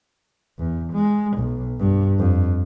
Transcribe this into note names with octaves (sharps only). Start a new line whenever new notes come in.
E2
G#3
B1
G2
F2